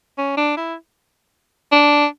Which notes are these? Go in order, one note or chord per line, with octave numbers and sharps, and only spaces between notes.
C#4
D4
E4
D4